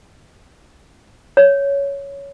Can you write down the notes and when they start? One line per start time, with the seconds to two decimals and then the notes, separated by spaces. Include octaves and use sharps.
1.37 C#5